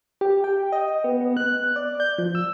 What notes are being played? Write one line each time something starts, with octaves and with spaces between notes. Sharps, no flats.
G4
G5
D#5
B3
B3
F#6
D5
G6
F3
E6